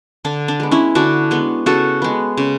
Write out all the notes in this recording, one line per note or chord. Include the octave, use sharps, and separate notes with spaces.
D3 D4
D4
G#3 B3
C#4 E4
D3 D4 F#4
G#3 B3
C#3 F#4 A4
G#3 B3
C#3